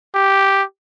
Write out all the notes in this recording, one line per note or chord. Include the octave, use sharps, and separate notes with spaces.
G4